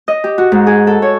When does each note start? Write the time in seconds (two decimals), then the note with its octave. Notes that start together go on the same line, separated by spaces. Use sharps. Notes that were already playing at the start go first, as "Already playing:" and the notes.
0.08 D#5
0.24 G4
0.38 F#4
0.52 G#2
0.67 G#4
0.87 A4
1.02 C#5